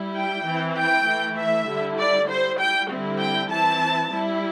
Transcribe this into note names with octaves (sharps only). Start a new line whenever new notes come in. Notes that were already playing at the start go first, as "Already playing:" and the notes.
Already playing: G3 E4
G5
E3 C4 E4
G5
E3 A3 E4
E5
D3 G3 E4
D5
G3 E4 C5
G5
D3 G3 C4 E4
G5
E3 C4 E4 A5
G3 E4